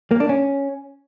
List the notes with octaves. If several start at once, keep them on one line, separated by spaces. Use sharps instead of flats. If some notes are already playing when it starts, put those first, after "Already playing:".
A#3
D4
C#4